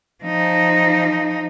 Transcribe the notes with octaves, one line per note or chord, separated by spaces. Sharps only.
F3 D#4